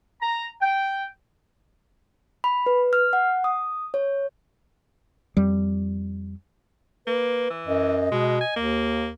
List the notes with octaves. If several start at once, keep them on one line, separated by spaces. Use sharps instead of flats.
A#5
G5
B5
B4
F6
F#5
D#6
C#5
F2 G3
A#3 B4
E3
F#2 D#5
B2 G#3
G#5
D#2 A#3